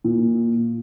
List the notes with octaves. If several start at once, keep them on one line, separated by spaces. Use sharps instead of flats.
A#2